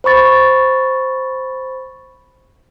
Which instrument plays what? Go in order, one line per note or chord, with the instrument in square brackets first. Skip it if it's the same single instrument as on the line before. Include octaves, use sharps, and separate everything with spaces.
[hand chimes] C5 B5 C#6 A6